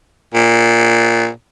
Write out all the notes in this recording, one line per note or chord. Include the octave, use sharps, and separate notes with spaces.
A#2